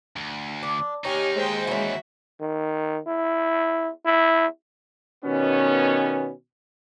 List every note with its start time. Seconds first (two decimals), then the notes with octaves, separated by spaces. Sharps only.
0.16 D2
0.63 D4
1.05 D#2 D#4 G4 C#5 G#5 F6
1.35 G#3 G4 C5 G5
1.67 E3 C#4 F#4 E5
2.40 D#3
3.07 E4
4.06 E4
5.25 B2 D#3 G3 B3 C#4